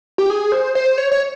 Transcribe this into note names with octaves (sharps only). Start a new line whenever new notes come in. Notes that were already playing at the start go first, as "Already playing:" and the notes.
G4
G#4
C5
C5
C#5
C#5